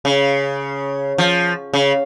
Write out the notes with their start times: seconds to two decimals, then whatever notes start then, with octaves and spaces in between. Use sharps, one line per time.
0.05 C#3
1.18 F3
1.73 C#3